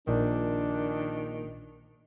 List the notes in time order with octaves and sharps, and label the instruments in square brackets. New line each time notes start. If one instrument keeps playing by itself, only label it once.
[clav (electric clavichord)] A#1 A#2 D5 [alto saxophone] D#3 [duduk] D4